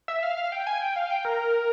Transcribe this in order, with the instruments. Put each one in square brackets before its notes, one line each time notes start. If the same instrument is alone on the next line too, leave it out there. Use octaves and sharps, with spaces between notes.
[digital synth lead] E5
F5
F5
G5
G#5
G5
F5
G5
A#4